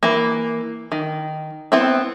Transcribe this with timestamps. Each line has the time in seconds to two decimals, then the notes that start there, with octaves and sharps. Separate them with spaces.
0.03 E3 A#3
0.92 D#3
1.72 B3 C4 E4